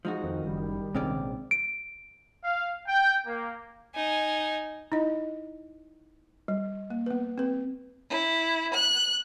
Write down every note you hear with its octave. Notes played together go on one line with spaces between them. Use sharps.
F3 G#3 D#4 F#4
F2 D#3
F#1 G3
A#1 G#2 C3 C4 C#4 D5
D7
F5
G5
A#3
D#4 G#5
D#4 E4 D#5
G3
A#3
B3 B4
C4 B4
E4
F#6